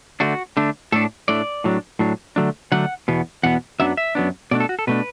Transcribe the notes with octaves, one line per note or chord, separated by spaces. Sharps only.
D3 A3 D4 F#4
D3 A3 D4
A2 A3 D4 A4
A2 A3 D4 D5
A2 F#3 D4
A2 F#3 D4
D3 F#3 A3 D4
D3 F#3 A3 D4 F#5
E2 B2 B3
E2 B2 B3 F#5
F#2 F#3 B3 D4 E5
E5
F#2 F#3 B3 D4
B2 A3 D4 D5
A4
F#4
A4
B2 A3 D4 B4